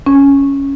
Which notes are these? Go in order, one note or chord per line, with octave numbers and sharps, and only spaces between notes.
C#4